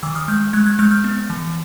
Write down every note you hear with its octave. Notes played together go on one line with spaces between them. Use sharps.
D#3 D6 E6
D#6 F6
G#3 F6 G6
G#3 F#6 G#6
F#6 G#6
G#3 F6 G6
F6 G6
B3
E3